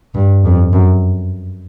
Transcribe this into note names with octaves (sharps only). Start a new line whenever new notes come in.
G2
F2
F#2